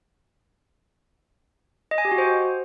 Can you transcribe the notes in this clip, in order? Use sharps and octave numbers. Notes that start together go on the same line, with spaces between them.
D#5
G#5
G4
F#4
C5